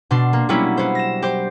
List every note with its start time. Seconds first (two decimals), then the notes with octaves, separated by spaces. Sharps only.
0.11 B2 D4 C6
0.33 A#3
0.49 F#3 G3 A#3 B3 C#4 E4
0.77 B3 C5
0.95 A#6 E7
1.22 G4 C5